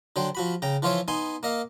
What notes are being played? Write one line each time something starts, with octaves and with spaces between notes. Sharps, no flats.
D3 F#3 C5 G5
F3 F#4 B5
C#3 G5 A#5
E3 F3 F4 C5 C#5 E5
B3 D#4 G#5 C6
A#3 D#5 F5